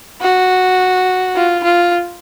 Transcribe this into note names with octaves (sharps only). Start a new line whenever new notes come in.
F#4
F4
F4